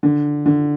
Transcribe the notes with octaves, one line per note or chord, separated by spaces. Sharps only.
D3
D3